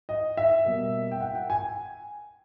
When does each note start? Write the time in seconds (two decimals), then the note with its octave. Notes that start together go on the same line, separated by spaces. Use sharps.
0.09 D#5
0.37 E5
0.64 B2 G3 A#3
1.11 G5
1.20 F#5
1.35 G5
1.50 G#5